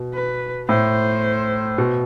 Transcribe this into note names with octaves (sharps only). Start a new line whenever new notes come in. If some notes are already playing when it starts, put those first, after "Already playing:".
Already playing: B2
B4
A2 C5
B2